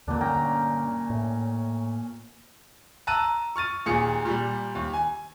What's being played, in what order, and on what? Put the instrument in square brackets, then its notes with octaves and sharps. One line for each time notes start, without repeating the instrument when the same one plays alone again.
[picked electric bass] D#2 D3 A#3 [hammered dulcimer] A#2 D4
[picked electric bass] G2 D3 [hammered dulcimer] C#4 G5 A#5
[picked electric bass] A2
[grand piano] A5 A#5 E6 F#6 D#7
C#6 F6 A6 D#7
D#2 A#2 G#4 C#7
A#2 G3
D#2
G#5